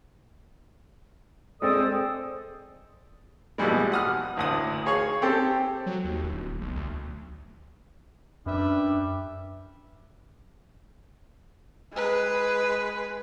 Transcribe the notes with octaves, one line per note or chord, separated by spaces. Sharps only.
G#3 C4 A4 D5 D#6
A#1 B2 E3 G3 G#3
F#5 D#6 F6
A1 D2 D#6
G#4 C#5 F5 C#6
C4 G4 A4
F#3
D#2
D1
B1
D2
F#2 G3 D4 B4 E5
G#3 B4